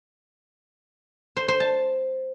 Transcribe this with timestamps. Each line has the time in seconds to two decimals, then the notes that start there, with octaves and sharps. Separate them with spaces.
1.37 C5
1.48 C5
1.60 A5